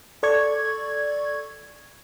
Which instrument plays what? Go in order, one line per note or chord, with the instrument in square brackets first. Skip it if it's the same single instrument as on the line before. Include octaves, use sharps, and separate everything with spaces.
[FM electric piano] A4 D5 C#6 G#6